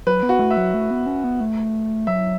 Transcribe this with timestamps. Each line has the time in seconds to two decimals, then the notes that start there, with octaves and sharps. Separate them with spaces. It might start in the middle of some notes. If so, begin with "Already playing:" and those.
0.07 F#3 B4
0.23 B3
0.29 F#4
0.39 A3
0.51 E5
0.57 F#3
0.74 A3
0.91 B3
1.06 C#4
1.24 B3
1.40 A3
2.07 F#3 E5